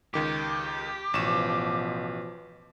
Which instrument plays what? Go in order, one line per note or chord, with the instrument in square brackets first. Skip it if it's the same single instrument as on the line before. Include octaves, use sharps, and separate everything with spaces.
[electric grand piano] C#2 D#3 D6 [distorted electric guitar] G4
[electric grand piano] A1 C#6 E7 [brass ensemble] B2 F3